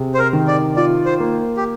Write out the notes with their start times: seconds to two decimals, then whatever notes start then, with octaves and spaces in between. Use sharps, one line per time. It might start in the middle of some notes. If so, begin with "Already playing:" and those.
Already playing: C3 G#4
0.14 C5
0.19 A#4
0.33 D#3
0.48 D5
0.76 F4 D5
1.05 C5
1.20 A#3
1.57 G4